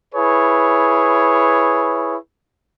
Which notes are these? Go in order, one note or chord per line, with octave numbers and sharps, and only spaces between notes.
E4 G#4 B4 C#5